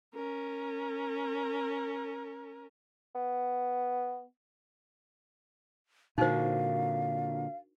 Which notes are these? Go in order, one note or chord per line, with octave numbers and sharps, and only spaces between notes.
C#4 A#4
B3
A#2 D3 D4 D#4 F#4 A#4 C5 F5